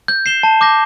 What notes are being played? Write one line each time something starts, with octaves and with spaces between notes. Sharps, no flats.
G6
C7 E7 G7
A5
D6 G6 A#6